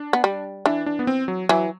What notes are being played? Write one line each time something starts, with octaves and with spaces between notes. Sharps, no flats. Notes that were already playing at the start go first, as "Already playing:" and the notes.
Already playing: D4
B3
G3
E3 D4
D4
B3
C4
F#3
E3 F#3